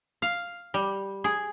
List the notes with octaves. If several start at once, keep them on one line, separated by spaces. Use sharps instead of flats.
F5
G3
G#4